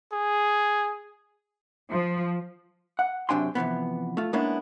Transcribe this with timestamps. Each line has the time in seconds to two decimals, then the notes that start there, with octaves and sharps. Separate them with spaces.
0.13 G#4
1.90 F3
2.99 F#5
3.29 F#2 C3 D4 G5 G#5 C6
3.55 C3 E3 F3 B3
4.17 A3 F4
4.33 G#3 A#3 B3 C#4 D4 E4